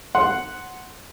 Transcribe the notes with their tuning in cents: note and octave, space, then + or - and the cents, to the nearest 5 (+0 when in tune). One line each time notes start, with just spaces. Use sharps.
F#5 +0 C6 +0